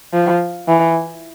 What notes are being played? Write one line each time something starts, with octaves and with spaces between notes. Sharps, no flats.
F3
E3